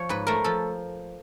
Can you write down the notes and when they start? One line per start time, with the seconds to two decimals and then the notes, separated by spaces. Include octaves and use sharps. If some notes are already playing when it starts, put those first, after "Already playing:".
Already playing: F3 C#5
0.09 G#2 B4
0.27 A3 A#4
0.44 F3 A4